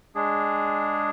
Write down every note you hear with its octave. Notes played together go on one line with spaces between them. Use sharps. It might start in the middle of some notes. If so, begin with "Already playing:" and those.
G#3 D4 G#4